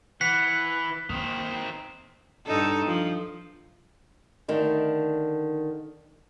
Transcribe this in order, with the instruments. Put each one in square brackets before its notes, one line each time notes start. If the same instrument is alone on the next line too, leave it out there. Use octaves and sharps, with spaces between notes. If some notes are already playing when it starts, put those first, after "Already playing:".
[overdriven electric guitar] E3 [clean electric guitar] F#5 [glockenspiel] B6
[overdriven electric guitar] D#3 C4 [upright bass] A#3
[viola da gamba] G2 D#4 A4
F3
[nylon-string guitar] D3 D#3 A3